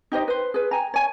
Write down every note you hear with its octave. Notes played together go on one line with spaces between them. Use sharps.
D#4 G4 C5 D#5
B4 C5
G#4 B4
G5 G#5 A#5
C#5 G#5